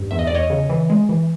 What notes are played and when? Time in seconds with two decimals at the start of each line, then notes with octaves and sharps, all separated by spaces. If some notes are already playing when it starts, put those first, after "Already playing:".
Already playing: G2
0.11 E2 E5
0.19 D#5
0.27 D5
0.31 E2 C#5 D#5
0.50 C#3
0.69 E3
0.90 G#3
1.09 E3